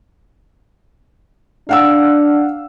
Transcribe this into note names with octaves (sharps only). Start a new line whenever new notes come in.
D4 F5 F#5 E6